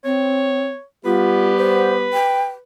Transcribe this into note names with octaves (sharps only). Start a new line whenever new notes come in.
C4 C#5
G3 B3 F4 G4 B4
C5
G5